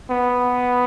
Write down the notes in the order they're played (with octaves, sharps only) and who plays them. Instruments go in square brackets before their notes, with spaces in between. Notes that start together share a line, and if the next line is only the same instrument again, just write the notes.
[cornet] B3